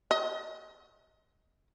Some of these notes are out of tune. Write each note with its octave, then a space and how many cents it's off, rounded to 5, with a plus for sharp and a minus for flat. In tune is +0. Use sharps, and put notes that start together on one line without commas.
D#5 +20